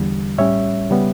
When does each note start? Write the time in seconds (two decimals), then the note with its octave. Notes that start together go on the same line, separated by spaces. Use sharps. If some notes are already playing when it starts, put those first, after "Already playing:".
Already playing: E2 D3 G3
0.38 A2 G3 C#4 C#5 E5
0.90 C#3 G3 B3